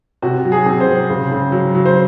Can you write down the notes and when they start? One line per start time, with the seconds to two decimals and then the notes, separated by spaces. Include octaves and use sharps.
0.22 C3 F#4
0.45 F#3
0.52 G#4
0.66 C3
0.80 C5
0.88 F#3
1.10 C#3
1.32 C#3
1.52 F#3
1.75 F#3
1.86 C5